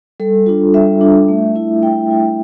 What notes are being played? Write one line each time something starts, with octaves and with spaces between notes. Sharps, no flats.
G3 A4
D4 F4
G3 E5
D4 F4
A3
E4
A3 G5
E4